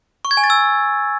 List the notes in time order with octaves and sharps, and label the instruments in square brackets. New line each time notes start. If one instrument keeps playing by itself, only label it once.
[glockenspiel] C#6
G#6
G#5
A6
E6